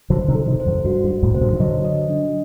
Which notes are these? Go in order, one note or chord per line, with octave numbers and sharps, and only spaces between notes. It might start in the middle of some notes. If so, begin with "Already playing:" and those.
D3 F#3 C5
C3 D#3
A4
C3 D#3
C5
F#2
G2 F#4
G2
F#4
F#2 A2
C3 C5
G2 A#2
D#3
D3 F#3 D#5
D#5
D4